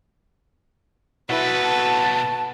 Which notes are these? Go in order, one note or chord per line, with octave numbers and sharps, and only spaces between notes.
B2 E4 F#4 A4 B4
A5